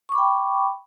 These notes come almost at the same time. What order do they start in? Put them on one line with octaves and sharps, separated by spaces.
C#6 D6 B5 G5